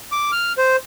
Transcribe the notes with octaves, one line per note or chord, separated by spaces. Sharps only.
D6
F6
C5